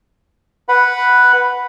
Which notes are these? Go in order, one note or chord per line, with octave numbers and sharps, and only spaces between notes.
B4 F#5 B5